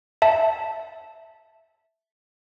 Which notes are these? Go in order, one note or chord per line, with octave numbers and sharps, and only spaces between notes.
E5 A5